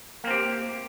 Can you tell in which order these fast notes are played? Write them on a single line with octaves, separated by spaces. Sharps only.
A#3 C4 G4